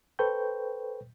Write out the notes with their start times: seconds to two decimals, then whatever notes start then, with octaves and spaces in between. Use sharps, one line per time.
0.19 A4 B4 C5 G5 C#6 G6